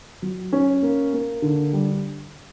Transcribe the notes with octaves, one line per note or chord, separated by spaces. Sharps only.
F#3
C#4
A#3
A#3
D3
G3